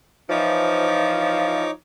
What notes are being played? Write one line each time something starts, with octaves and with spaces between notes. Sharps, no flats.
E3 F3 D#4 C#5 D6